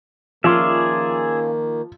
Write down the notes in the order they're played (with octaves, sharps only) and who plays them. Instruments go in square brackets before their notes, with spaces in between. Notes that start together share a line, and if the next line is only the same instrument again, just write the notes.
[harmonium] D#3 A#3 [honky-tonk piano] F3 [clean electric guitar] C#4 F4 [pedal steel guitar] G#4 D5 E5